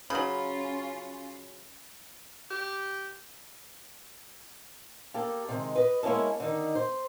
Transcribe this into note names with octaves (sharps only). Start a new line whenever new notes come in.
C#3 F#3 C#4 F4 B5
G4
A#3 G4 A4
C3 D#3 G#3
B4 D#5
G#3 A#3 C#4 E4 A4
D3 D#3 D#4
C5